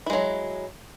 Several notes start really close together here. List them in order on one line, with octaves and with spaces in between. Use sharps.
E4 G#3 F#3